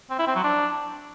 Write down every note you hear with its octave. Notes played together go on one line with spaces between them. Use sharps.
C4
E4
C4
F#3
D4